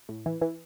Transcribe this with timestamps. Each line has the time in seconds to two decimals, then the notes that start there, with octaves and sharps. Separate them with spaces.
0.09 A2
0.26 E3
0.41 E3